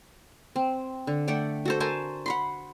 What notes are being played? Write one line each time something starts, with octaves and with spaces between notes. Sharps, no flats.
C4
D3
A3 D5 F#5 G5
F#4 A4 C5
A#4 C5 G#5 A5
F#5 B5 C6